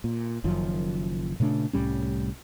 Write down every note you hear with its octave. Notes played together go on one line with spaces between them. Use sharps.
A#2
F#1 F#2 D#3 F3
A#2 C#3 A3 D4
C2 A2 G3 C#4